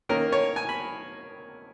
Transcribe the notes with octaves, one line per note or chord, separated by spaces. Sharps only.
D#3 A#3 C#4 A#4
C#5
G#5
B5